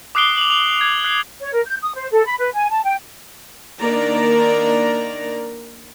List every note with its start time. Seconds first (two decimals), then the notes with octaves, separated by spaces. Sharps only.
0.15 D6 D#6 F#6 C7 D7 G7
0.37 F7 F#7
0.50 F7 F#7
0.81 G#6
1.04 F#6 C7
1.40 C#5
1.54 A#4
1.66 G6
1.82 D#6
1.94 C5
2.11 A4
2.25 B5
2.38 B4
2.53 G#5
2.70 A5
2.84 G5
3.80 D#3 A#3 D4 A#4 D5 A#5